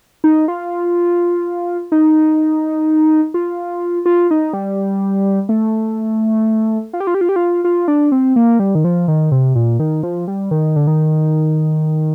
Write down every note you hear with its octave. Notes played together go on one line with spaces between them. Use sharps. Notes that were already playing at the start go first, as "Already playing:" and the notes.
D#4
F4
D#4
F4
F4
D#4
G3
A3
F4
G4
F4
G4
F4
G4
F4
F4
D4
C4
A#3
G3
D#3
F3
D#3
C3
A#2
D#3
F3
G3
D#3
D3
D#3